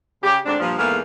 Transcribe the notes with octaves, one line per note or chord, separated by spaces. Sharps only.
C#3 G4
D2 G#2 C4 D4
G2 A#2 F3
E2 G#2 A3 A#3 F5